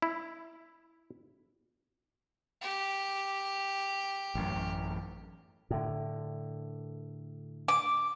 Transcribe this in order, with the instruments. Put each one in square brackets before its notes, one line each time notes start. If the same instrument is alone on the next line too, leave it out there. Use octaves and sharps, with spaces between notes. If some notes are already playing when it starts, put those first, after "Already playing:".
[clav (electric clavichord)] E4
[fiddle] G4
[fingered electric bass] A1 F#2
[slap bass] A2 D3
[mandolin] D6